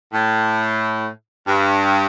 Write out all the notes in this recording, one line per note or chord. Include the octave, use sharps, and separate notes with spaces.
A2
G2